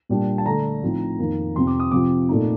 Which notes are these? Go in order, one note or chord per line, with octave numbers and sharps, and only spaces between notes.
A#2 G3 D4
A5
D3 A3 D4 A#5
A2 F3 C4 D#4
F2 D#3 A#3 D#4
F2 C3 F3 C4 C6
D6
D#6
C3 F3 C4 D6
A#2 A3 D#4